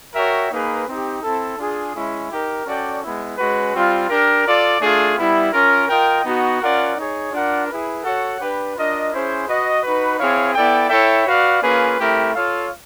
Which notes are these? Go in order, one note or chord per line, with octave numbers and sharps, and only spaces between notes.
F#4 A#4 C#5 E5 G5
A#3 D#4 G#4 B4
C4 D#4 G4
C4 E4 A4
D4 F4 G#4
G#3 C#4 E4
D#4 G4 A#4
C#4 F#4 A4 D5 G5
G#3 B3 E4
G#3 C#4 F#4 B4
G3 C4 F4
D4 G4 A#4
F4 A4 D5
A3 D4 F4 G#4
G3 B3 E4
C#4 F4 A#4
F4 A#4 D#5 G5
B3 D#4 F#4
C#4 F4 A#4 D5 F#5
D#4 G#4 C#5
D4 F4 A#4 D5 F#5
E4 G#4 B4
F#4 A4 C#5 F#5
D4 G4 B4
D4 F4 A#4 D#5
C#4 E4 G#4 C5
F#4 B4 D#5
D#4 F#4 B4
C4 E4 G#4 C#5 F5
B3 E4 A4 D5 G5
E4 A4 C#5 E5 G5
F#4 B4 D5 F5
A#3 C#4 F4 G#4 B4
A3 C4 E4 G4 A#4
F4 A4 C#5 F5